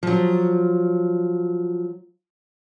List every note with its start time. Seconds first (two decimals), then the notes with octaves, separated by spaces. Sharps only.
0.03 F3 F#3